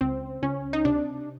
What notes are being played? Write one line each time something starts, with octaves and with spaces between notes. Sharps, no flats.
C#2 C4
C#2 C#4
D#4
C3 D4